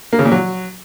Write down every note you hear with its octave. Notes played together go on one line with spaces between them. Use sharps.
A#3
C#3
A#2
F#3